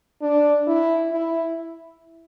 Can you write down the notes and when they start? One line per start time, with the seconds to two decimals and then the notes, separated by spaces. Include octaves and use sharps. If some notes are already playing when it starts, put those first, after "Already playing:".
0.22 D4
0.67 E4
1.11 E4